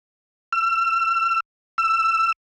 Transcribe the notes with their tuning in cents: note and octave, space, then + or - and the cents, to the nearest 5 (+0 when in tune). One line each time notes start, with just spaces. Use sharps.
E6 +40
E6 +20